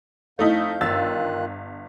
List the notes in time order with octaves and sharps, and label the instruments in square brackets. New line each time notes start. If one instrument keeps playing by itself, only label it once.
[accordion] F2 F5 G6 [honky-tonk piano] A3 D#4 E4
[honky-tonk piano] G1 E6 A6 [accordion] D#3 F4 F#6